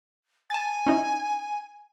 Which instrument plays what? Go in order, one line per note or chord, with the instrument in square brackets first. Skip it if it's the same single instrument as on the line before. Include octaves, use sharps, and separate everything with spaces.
[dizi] G#5 [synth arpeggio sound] A5 A6
[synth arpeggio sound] C#4 D#4 E4